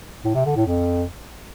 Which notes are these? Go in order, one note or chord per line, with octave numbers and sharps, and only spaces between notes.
A2
C3
D3
A2
F2